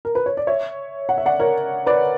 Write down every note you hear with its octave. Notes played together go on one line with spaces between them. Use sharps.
A#4
B4
C#5
D5
C#5 E5
F#5
E5
D5 F#5
A#4 C#5
B4 D5